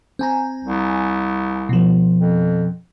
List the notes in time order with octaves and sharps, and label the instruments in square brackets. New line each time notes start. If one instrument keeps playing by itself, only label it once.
[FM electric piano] C4 G#5 A#5
[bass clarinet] C2
[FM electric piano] B2 F3
[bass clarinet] F2